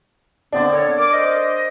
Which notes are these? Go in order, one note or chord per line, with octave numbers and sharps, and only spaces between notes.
D3 B3 C4 D4 D5
A4 A#4 C#5
A#4 D6
C5 D#5